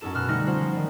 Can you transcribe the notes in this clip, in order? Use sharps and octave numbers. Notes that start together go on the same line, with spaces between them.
F#2 C#4 D#4 A4 E7
B2 F6 F#6 E7
D3 G3 A3 D#4 A#6 C#7
C#4 F4 C5 F#5
F3
D#3 G3